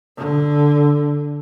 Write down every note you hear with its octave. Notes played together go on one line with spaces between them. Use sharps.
D3